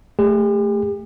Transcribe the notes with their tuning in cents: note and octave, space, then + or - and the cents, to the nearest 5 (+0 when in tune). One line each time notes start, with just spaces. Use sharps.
A3 +0 G4 +45